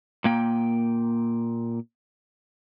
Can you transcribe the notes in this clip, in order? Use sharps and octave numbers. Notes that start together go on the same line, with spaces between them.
A#2 A#3 G5